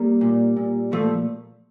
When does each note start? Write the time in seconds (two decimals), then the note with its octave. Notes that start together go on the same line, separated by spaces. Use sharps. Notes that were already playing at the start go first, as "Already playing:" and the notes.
Already playing: G3 A#3
0.21 A#2
0.56 A#2
0.92 A#2 F3 A3